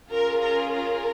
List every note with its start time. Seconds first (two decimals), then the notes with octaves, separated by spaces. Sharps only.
0.11 C#4 F4 G#4 A#4
0.43 A#4
0.73 A#4